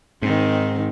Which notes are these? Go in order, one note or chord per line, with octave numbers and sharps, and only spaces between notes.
G#2 D#3 C4